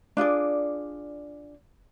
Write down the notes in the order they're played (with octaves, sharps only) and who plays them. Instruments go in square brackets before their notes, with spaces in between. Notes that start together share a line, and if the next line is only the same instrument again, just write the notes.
[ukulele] D4 F4 G#4 D5